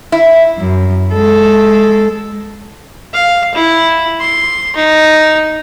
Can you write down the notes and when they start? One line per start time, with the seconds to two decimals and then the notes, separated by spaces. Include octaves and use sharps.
0.12 E4
0.58 F#2
1.14 G#3 A4
3.14 F5
3.55 E4
4.20 C6
4.76 D#4